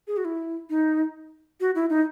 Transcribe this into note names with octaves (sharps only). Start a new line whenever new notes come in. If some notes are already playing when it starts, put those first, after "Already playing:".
G#4
F#4
E4
D#4
F#4
E4
D#4